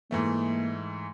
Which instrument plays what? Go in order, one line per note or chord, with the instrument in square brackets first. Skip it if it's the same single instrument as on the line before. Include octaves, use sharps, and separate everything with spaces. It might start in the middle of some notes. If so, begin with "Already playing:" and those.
[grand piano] G#2 E3 A3 [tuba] A#3